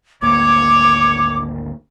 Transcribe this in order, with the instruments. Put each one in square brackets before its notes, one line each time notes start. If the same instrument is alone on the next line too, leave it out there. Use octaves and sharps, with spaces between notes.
[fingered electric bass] G#1 D2 A#3 [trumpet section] C#5 [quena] D6